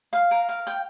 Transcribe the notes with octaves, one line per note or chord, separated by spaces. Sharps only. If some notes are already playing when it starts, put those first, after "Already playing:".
F5
A#4
F5
G5